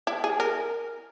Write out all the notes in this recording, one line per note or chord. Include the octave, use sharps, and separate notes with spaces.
E4
G#4
A#4